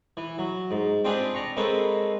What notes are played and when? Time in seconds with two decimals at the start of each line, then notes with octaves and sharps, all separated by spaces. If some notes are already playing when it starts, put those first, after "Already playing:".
0.17 E3
0.38 F#3
0.71 G#2
1.04 C4 D4 F4 G4 G#4 B4
1.34 D5 A#5 C#6
1.57 G#3 A#3 C4 A4 B4 C#5